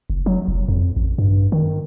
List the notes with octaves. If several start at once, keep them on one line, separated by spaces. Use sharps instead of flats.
F#1
F#3
F1
F2
A1
G2
D#3